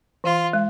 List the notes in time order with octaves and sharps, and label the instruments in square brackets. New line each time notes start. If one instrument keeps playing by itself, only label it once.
[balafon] E3 [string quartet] F4
[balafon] G#3